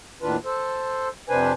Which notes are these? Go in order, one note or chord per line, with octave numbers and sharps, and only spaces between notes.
D#2 A2 D#3 D4 F4 B4
A4 C5
F2 C3 D4 B4 C5 G#5